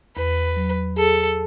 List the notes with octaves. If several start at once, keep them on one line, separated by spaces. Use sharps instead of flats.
E2 B4
F#3
G#4 A4